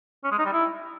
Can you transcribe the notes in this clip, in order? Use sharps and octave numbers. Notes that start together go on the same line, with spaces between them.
C#4
G#3
D#4
G3
E4